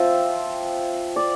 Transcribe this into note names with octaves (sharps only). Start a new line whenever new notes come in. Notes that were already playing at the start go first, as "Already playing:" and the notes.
Already playing: F3 C4 F4 E5
D5